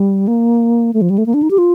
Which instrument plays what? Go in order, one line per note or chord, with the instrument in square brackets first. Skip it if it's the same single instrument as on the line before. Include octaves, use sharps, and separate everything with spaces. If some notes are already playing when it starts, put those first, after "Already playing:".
Already playing: [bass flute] G3
A#3
A3
F3
G3
A3
A#3
D4
D#4
G4
F4